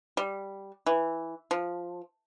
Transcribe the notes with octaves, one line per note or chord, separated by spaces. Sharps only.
G3
E3
F3